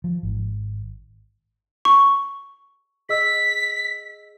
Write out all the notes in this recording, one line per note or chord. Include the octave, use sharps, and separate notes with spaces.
F3
G#1
C#6
G#4 D#5 E6 B6